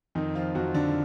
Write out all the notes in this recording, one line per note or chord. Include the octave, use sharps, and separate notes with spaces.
F2 D#3 D#4
F3 F4
F2 F#3 F#4
D3 D4